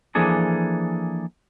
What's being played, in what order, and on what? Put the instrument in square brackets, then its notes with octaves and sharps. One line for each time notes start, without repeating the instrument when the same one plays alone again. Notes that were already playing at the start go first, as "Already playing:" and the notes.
[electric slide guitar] E3 F3 A#3 D4 G#4 A4